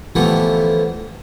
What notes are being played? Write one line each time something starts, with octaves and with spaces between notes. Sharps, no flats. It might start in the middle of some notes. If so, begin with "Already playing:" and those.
D3 E3 F3 G3 A3 B3